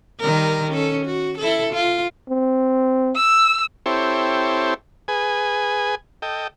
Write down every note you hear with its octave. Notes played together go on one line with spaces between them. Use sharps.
D#3 G3 A#4
C#4 A4
F#4
E4 A4
F4
C4
E6
C4 E4 G4 A4 C5 C#5
G#4 B4 G#5
A4 D#5 G5